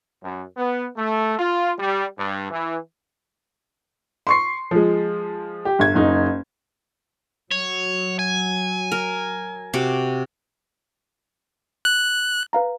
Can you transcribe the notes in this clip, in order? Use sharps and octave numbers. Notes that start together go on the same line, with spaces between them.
F#2
B3
A3
F4
G3
G2
E3
C6 C#6 C7
F3 G#3
G4
G1 G#6
F#1 D#4
F#3 C#5
G#5
A#4
C3 F#4 D6
F#6
B4 F5 A#5